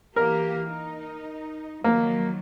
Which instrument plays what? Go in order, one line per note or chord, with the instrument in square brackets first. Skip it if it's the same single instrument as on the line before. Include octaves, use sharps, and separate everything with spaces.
[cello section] E3 A#3 G4 [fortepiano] A#4
[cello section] D#4
[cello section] D#3 F3 F#3 [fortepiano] A#3